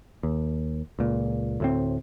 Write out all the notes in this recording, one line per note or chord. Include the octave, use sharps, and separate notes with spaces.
D#2
C#2 A#2
D2 A2 C4